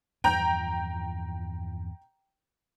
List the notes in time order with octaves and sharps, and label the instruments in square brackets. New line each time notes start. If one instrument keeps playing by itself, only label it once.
[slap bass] E2 G2 F3 [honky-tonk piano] G5 A#5 G6